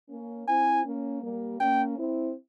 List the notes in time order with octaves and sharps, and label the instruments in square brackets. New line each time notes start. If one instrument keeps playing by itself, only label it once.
[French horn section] A#3 C#4
[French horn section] C4 E4 [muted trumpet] G#5
[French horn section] A#3 C#4
G3 A#3
[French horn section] A#3 C#4 [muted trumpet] G5
[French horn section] C4 E4